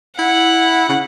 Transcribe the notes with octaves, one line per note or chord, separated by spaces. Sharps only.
E4 F#5
C#3